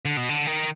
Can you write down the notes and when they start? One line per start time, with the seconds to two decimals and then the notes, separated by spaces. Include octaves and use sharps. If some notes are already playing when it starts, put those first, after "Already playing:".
0.05 D3
0.17 B2
0.29 D3
0.47 D#3